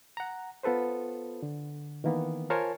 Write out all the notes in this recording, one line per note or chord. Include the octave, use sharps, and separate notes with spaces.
F#5 A#5
B3 F4 A4 B4 C5
D3
D#3 E3 A#3 B3
F4 A#4 C5 C#5 G#5 A5